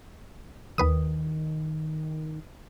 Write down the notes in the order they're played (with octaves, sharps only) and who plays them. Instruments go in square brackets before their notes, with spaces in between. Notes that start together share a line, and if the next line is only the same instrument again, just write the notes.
[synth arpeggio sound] D#2 B4 D#6 [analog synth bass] D#3